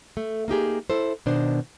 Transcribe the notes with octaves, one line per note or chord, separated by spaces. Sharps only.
A3
A#3 D#4 G4 G#4
E4 A4 C5
B2 D#3 D4 C5